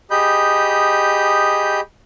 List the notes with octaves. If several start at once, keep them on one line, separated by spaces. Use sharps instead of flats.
G4 G#4 D#5 B5 G6